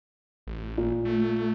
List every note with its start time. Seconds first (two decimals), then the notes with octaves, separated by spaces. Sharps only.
0.47 A1
0.78 A#2
1.05 A3